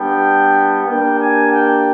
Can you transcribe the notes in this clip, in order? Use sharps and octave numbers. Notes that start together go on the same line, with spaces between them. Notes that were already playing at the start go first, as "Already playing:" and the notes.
Already playing: G3 B3 D4 G5
A#3 D4 G4 G5
G#5
G5